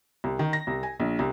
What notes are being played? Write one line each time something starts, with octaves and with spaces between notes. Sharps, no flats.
C2
D#3
A#6
C2
G#5
A#1
C2